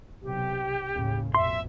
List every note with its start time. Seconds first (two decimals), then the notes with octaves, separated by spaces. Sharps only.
0.23 B1 C3 G4
0.92 D#2 A2 C#3
1.35 A1 F2 B2 E5 C6